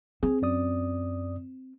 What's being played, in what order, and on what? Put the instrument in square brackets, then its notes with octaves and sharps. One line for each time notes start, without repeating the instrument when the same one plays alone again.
[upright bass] C4 [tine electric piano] G#4
[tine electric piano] F#2 D5 D#6